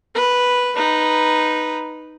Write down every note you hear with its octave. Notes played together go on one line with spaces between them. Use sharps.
B4
D#4 B4